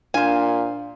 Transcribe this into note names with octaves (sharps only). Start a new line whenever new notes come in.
A#2 D4 C5 F5 G#5